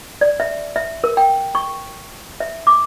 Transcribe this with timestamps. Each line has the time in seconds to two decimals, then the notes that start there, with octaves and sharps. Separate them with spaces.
0.21 D5
0.40 E5
0.76 E5
1.04 A#4
1.17 G5
1.55 C#6
2.40 E5
2.67 D6